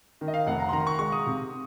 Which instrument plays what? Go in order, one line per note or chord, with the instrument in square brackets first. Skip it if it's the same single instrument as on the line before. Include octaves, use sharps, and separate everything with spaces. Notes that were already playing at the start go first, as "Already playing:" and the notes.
[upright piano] D#3
[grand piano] D#5
F5
[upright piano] F1 [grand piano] F#5
[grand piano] A#5
C6
[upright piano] D#3 [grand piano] A#5
[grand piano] C#6
[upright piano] G#3 [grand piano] C#6
[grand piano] D#6
[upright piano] C3